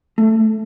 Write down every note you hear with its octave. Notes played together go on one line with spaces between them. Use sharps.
A3